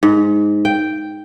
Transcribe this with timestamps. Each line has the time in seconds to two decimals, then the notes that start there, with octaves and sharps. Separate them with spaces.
0.03 G#2
0.65 G5